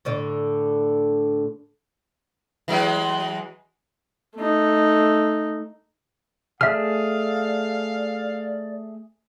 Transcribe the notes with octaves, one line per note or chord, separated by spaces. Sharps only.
A2 D3 D5
E3 F#3 G#3
A3 D#4
A3 G#4 D5 E5 F5 F6